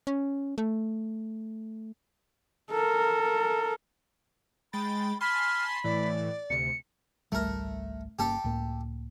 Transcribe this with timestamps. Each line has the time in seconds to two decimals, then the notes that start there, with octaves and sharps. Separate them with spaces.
0.07 C#4
0.58 A3
2.71 A4 A#4
4.73 G#3 G5 B5 A6
5.21 G#5 A5 B5 C6 F6
5.84 A2 E3 D5
6.50 D2 C3 C#7
7.32 G#1 C#2 G3 A3 A#4
8.19 G1 A#3 C#4 G4 A4
8.44 C#2 A2 A#3